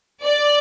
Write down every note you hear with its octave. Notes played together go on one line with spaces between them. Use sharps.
D5